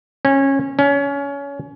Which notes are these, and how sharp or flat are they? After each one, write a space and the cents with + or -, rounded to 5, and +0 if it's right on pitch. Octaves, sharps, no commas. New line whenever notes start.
C#4 -20
C#4 +25